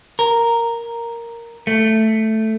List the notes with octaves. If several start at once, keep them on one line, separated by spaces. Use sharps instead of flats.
A#4
A3